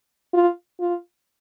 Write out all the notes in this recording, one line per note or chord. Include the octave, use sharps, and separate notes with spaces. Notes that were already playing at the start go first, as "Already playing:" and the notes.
F4
F4